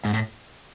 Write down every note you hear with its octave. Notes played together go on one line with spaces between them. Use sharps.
G#2
A2